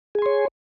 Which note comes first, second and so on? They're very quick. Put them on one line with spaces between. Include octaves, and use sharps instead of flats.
G#4 G#5 C6 C#5